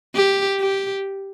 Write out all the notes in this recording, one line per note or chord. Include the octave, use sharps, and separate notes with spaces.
G4
G4